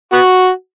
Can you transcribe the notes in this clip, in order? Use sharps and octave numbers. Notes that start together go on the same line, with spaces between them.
B3 F#4